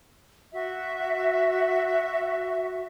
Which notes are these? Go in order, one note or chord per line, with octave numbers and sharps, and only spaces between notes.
F#4 E5